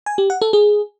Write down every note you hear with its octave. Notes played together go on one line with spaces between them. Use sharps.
G#5
G4
F#5
A4
G#4